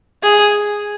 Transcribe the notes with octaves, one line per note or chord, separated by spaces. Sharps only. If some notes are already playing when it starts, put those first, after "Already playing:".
G#4